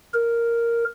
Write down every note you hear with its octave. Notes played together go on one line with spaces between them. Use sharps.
A#4